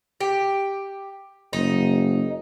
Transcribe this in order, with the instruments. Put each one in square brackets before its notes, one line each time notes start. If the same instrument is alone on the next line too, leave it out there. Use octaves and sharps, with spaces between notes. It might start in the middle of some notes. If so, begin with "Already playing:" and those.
[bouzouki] G4
[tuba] F#1 [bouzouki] D#4